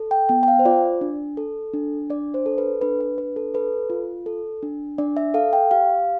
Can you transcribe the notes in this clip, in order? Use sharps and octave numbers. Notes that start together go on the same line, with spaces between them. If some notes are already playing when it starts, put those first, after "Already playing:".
Already playing: A4
G5
B3 G5
G5
F5
C5
F4 D5
D4
A4
D4
D4 D5
C5
A4
B4
D4 B4
B4
D4 B4
A4
A4 B4
F4
A4
D4
D4 D5
E5
A4 F5
G5
G4 F5